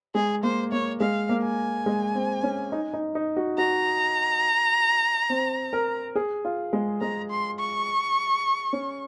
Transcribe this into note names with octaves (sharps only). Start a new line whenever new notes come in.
G#3 G#4
A#3 C5
A#3 C#5
G#3 F5
A#3
G#5
G#3
C4
C#4
D#4
D#4
D#4
F#4
F#4 A#5
C4
A#4
G#4
F4
G#3
G#3 A#5
C6
C#6
C#4